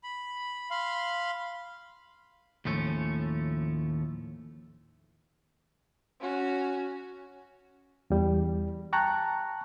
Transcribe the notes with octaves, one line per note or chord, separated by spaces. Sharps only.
B5
F5 B5 C6
D#2 A2 F3 A3 C#4
C#4 F#4
E2 G3
G5 A5 A#5 C#6 F#6